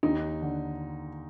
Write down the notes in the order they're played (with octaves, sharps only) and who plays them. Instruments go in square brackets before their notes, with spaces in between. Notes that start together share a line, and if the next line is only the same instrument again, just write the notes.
[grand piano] D#2 D#4
D3